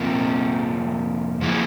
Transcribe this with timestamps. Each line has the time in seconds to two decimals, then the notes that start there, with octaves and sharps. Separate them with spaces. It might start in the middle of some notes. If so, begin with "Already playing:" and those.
Already playing: F2 C3 F3 A#3
1.41 F3 A#3 E4 G#4